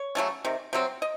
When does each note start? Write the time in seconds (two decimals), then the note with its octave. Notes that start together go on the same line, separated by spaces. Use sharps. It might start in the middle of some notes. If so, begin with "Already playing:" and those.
Already playing: C#5
0.15 C#3 F#3 A3 C#4
0.45 C3 D#3
0.73 C3 F#3 C4
1.02 D#5